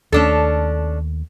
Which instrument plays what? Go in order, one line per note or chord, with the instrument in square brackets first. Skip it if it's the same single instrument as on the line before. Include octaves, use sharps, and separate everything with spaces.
[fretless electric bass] D#2 A3 [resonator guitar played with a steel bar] C#4 D4 A4